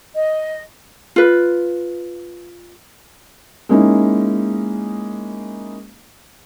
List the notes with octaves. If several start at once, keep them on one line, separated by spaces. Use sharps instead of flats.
D#5
F4 B4
G#3 A#3 C#4 D#4 E4